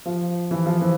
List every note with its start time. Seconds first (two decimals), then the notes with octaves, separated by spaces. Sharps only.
0.06 F3
0.51 E3
0.66 F3
0.81 E3